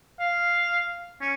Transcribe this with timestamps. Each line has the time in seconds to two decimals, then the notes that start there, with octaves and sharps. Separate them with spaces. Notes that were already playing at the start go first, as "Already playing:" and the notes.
0.20 F5
1.21 C#4